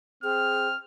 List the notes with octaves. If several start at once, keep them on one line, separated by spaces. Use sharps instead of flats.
C4 G#4 F6